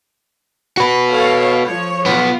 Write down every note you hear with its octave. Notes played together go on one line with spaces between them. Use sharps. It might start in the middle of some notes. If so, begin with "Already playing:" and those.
F#4 B4
A4 C#5 F5
F3 C#5
B1 B3 F4